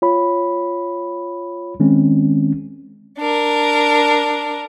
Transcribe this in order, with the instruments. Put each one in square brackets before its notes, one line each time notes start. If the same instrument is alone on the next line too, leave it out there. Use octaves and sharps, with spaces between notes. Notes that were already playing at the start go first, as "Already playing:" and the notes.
[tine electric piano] F4 C#5 B5
D#3 G#3 C4 C#4
[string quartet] D4 A#4